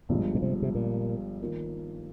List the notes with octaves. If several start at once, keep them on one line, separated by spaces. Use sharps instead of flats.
G1 G2 A#2 F3 G#3
A#2
C3
C3
A#2
D#3 A#3 F4